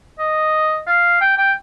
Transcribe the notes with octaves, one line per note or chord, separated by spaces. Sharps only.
D#5
F5
G5
G5